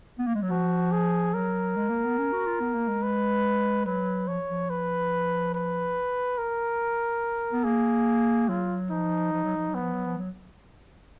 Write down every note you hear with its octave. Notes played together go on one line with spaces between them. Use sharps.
B3
A#3
G#3
F#3
F3 F#4
G#4
F#3 A#4
G#3
A#3
B3
C#4
F#4
F4
B3
A#3
G#3
B4
F#3 B4
F3 C#5
F3
B4
B4
A#4
B3
A#3 G#4
F#3 F4
F3 D#4
F3
F#3
F3
F#3
B3
F3
F#3
F3
F#3